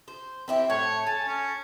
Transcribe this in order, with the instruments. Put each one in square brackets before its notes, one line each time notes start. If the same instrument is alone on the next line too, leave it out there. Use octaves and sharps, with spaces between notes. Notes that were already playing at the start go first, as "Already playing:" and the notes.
[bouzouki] C5
C4 E4 G4
[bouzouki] A2 [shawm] C#5
[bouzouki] A4 G#5 [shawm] A5
[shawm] C#4